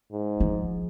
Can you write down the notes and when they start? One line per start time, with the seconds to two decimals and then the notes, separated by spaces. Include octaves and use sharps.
0.12 G#2
0.40 F3